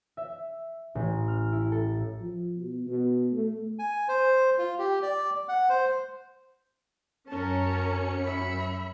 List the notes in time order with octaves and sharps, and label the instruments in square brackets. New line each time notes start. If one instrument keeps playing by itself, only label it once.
[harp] E5
A1
F6
E4
A4
[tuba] F3
B2
B2
A3
[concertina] G#5
C5
F4
G4
D5
F#5
C5
[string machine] F#2 C#7 [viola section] C#4 [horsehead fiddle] A#4 A5
[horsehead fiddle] E5 B5